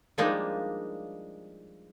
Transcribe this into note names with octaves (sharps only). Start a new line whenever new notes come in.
F3 G3 G#3 A#3 D4 D#4